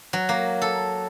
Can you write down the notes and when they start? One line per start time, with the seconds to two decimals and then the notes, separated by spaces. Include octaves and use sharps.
0.13 F#3
0.29 A#3
0.62 A4